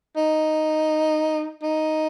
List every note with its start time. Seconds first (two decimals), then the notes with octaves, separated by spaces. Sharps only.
0.16 D#4
1.63 D#4